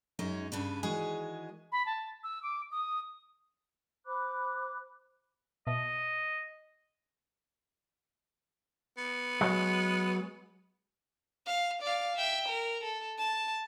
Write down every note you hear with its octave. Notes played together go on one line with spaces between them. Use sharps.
F#2 G#3 C#4 D#4
G2 C#3 D4 B4
D#3 E3 G#3 F#4 G#4
B5
A5
E6
D6
D#6
C5 B5 D6 F#6
B2 D#5 E5 A5
B3
F#3 G#3
F5
D5 F5
E5 G5
A#4
A4
A5